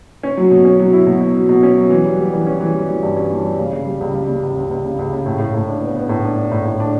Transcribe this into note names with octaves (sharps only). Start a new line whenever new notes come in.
C#4
F#3
B2
C#4
F#3
E4
B2
B2
F#3
B2
C#4
F#3
E3
G3
G3
E3
C#4
E3
G3
E3
G2
C#4
E3
G3
C#3
C#3
G3
C#2
G3
C#3
C#2
C#2
C#2
C#3
C#2
C#3
A2
A2
A2
D4
B3
B3
A2
D4
D4
A2
A2
D4